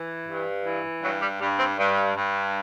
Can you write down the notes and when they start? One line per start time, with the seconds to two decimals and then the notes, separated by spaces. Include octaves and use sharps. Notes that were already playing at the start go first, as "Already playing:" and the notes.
Already playing: E3
0.26 G2
0.64 E3
1.01 G2 F#3
1.21 G3
1.39 G2 G3
1.58 C4
1.77 G2
2.15 G2